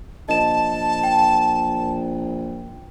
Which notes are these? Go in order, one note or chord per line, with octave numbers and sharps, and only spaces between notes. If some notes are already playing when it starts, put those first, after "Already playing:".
A#1 D#5 A5 E7
G5